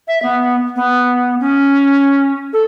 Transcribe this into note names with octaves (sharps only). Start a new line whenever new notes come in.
E5
B3
B3
C#4
A4